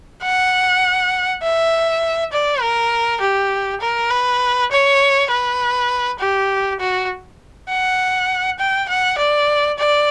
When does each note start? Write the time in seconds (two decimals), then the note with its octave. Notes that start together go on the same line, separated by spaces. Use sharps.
0.23 F#5
1.43 E5
2.32 D5
2.61 A#4
3.21 G4
3.80 A#4
4.10 B4
4.71 C#5
5.30 B4
6.19 G4
6.80 F#4
7.69 F#5
8.59 G5
8.88 F#5
9.18 D5
9.78 D5